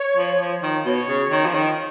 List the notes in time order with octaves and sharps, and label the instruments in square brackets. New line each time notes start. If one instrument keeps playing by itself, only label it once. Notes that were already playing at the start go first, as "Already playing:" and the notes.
Already playing: [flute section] C#5
[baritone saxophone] F3
F3
D#3
[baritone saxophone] B2 [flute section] C#5
[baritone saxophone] C#3
D#3
F3
D#3